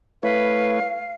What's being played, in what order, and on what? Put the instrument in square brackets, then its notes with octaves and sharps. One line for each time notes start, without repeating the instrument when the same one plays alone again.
[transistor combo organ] A3 E4 C#5 [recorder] B4 [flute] F5